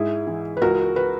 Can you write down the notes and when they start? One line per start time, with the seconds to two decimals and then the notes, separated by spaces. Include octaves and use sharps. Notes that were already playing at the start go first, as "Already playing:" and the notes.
Already playing: G#2 E4 G#4
0.27 E3
0.57 B4
0.62 C#2 F#4 A#4
0.96 B4